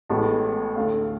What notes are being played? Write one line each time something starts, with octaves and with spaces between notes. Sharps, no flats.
A1 A2 G#3 B3 A5
D2 D3 A3 F5